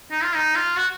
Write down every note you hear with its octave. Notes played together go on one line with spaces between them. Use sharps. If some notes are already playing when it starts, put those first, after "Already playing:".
D#4
F4
D#4
F4
F#4